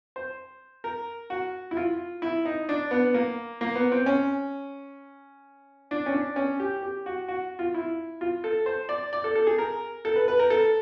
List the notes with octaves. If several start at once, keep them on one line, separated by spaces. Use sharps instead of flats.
C5
A#4
F#4
E4
F4
E4
D#4
D4
B3
A#3
A#3
B3
C4
C#4
D4
C#4
D4
C#4
G4
G4
F#4
F#4
F4
E4
F4
A4
C5
D5
D5
A4
A4
G#4
A#4
A4
B4
B4
A#4
A4